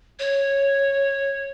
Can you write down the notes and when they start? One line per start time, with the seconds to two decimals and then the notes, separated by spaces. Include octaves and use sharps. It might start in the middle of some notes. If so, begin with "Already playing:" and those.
0.19 C#5